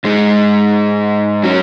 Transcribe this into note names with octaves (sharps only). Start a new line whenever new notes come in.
G#2 G#3 D#4
F#3 C#4